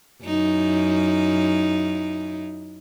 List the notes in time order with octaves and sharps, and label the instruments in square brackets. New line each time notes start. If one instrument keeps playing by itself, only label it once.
[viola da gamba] F#2 D#4 E4